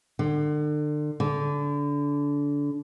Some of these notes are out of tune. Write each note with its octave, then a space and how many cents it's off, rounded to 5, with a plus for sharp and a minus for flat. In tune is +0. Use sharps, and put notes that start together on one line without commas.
D3 +35
D3 -25